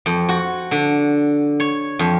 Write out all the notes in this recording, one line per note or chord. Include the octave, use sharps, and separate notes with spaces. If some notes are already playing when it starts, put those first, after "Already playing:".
F2
F#4
D3
C#5
F2